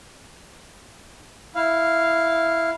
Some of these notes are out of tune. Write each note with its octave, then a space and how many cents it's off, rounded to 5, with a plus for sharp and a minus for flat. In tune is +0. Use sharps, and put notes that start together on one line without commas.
E4 +0 F5 -10